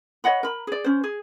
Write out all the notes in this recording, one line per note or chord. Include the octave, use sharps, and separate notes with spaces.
C#5 D#5 F#5 B5
A#4 B5
G#4 D5
C#4 C5
G#4